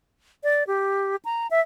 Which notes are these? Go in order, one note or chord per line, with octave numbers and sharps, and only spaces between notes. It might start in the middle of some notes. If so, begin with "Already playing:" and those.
D5
G4
A#5
E5